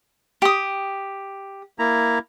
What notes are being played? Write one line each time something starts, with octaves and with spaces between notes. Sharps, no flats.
G4 D#6
A#3 E4 A#5